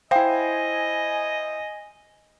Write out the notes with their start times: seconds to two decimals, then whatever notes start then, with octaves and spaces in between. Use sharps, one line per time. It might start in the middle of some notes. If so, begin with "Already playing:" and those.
0.11 E4 C5 D#5 F5 G5 G#5